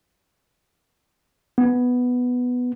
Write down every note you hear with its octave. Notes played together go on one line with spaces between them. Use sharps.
B3